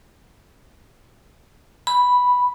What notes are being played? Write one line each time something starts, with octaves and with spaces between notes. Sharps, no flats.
B5